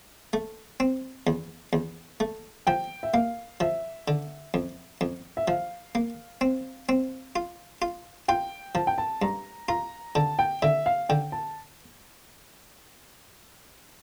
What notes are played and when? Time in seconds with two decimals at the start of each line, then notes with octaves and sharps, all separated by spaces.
0.33 A3
0.80 C4
1.27 E2
1.73 E2
2.20 A3
2.67 F3 G5
3.03 E5
3.14 A#3 F5
3.60 F3 E5
4.08 D3
4.54 F2
5.01 F2
5.37 E5
5.48 F3 F5
5.95 A#3
6.41 C4
6.89 C4
7.36 F4
7.82 F4
8.28 F4 G5
8.75 F3 A5
8.87 G5
8.98 A5
9.22 G2 A#5
9.69 F4 A#5
10.15 D3 A5
10.39 G5
10.62 D3 E5
10.86 F5
11.09 D3 G5
11.32 A5